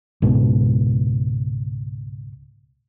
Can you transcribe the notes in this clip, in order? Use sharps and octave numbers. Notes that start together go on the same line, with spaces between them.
C#2 G#2 B2